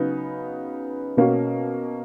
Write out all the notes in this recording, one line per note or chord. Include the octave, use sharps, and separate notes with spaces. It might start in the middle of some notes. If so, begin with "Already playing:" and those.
Already playing: C#3 F#3 B3 D#4
B2 A#3 C#4 F#4